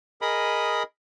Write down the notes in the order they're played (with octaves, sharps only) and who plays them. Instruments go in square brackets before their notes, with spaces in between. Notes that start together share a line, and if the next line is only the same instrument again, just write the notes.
[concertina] G#4 A#4 D#5 B5 D#6